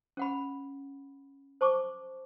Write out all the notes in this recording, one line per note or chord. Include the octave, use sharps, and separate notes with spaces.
C#4 F#5 B5
C5 A5 C#6 D6